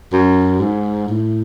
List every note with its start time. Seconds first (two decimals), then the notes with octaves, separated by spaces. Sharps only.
0.13 F#2
0.60 G#2
1.09 A2